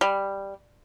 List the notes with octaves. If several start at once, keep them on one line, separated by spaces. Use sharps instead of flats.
G3